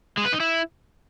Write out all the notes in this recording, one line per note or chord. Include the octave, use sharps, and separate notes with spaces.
G#3
B4
D#4
E4